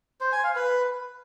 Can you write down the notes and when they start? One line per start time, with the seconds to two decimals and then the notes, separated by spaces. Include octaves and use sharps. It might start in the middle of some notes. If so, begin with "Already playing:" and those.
0.21 C5
0.32 G#5
0.44 F5
0.55 B4